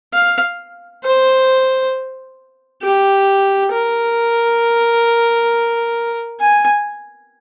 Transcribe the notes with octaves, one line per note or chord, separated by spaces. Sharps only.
F5
C5
G4
A#4
G#5